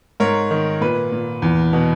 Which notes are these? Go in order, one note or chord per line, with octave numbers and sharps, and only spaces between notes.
G#2 A#4 C#5
D#3
A#2 B4
A#2
E2
B2